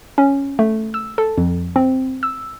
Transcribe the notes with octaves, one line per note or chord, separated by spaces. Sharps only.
C#4
A3
E6
A4
F2
C4
E6